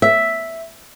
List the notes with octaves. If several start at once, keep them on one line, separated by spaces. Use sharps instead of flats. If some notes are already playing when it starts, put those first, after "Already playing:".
E5